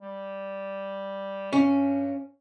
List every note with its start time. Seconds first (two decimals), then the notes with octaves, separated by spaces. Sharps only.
0.02 G3
1.53 G2 C#4